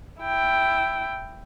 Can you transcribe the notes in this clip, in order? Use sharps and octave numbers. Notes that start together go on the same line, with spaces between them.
E4 G5